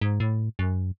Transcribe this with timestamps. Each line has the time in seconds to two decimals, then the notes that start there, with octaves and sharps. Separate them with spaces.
0.01 G#2
0.20 A2
0.59 F#2